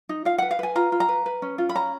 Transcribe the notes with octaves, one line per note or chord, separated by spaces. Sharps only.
D#4
F4 F5
B4 F#5
F5
B4 G#5
F4 A#5
F4
A#5
B4
B4
C#4
F4
B5
C#4 A#5